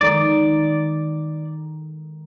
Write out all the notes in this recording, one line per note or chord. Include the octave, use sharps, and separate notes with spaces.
D#3 G#3 D#4 D5